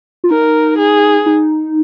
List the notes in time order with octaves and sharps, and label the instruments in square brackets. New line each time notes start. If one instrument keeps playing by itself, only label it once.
[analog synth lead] F4
[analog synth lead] D#4 [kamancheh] A#4
[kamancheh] G#4
[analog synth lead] D#4